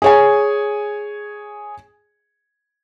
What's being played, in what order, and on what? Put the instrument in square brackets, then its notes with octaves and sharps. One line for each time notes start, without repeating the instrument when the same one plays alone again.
[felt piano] G#4 C#5 G#5